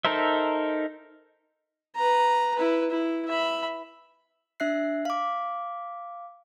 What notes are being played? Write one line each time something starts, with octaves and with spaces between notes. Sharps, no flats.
D#4 A4 A#4 C5 E5
B4 A#5
E4 B4
E4
E5 B5
D4 E5 F#6 C7
F5 D6